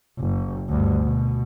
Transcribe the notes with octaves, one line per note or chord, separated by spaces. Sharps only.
F#1
D2 G2
B2